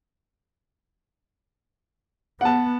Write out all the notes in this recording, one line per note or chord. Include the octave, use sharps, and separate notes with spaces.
B3 F#5 A5